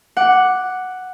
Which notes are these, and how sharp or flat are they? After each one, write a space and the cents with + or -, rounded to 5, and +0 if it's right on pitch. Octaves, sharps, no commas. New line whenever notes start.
F#5 +0 D6 +0